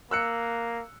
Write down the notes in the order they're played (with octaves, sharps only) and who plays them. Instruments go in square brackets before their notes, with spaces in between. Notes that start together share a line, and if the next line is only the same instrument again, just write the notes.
[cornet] A#3 [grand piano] E6 F#6 C#7